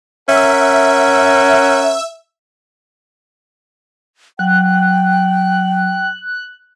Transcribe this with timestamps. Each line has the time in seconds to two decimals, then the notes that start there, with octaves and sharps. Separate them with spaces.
0.28 C#4 A#4 E5 F#5
4.39 F#3 G5 F#6